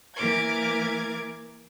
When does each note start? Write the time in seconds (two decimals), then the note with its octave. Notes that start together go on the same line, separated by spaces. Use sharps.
0.16 E3 A#3 A#4 D6 G#6